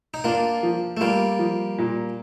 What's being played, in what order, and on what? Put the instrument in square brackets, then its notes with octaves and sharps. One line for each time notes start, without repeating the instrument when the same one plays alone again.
[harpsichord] D#4
[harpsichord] A#3 D4 [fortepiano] F4
[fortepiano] F3
[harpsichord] A3
[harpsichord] G3 A#3 [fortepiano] F4
[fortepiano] F3
A#2